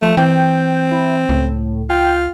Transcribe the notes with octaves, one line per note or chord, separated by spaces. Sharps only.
F3 A3
E3 C4 G5
E4
C#2 A2
F4 G5